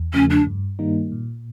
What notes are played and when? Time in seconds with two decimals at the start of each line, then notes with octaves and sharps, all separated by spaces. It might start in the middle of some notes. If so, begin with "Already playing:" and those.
Already playing: E2
0.13 C#3 F3 A3 C#4
0.30 D4
0.47 G2
0.79 D#3 G3 A#3 D#4
1.12 A#2